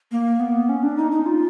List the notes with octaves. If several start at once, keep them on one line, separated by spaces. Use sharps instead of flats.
A#3
B3
C#4
D4
D#4
D#4
F4